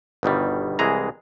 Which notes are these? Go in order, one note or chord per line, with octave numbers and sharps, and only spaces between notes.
G1 B2 D#3 G3
C2 E3 G#3 G#4 A#5